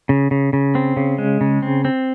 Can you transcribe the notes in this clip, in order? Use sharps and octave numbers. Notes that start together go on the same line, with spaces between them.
C#3
C#3
C#3
C4
C#3
G#3
C#3
C4
C4